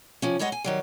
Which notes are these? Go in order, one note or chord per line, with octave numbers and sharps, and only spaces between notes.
C3 F3 C#4
G3 G#3 C#5 D#5 F#5
G#5
D#3 F#3 G3